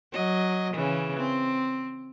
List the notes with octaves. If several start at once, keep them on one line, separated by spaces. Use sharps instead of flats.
F#3 D#5
C#3 E3
C4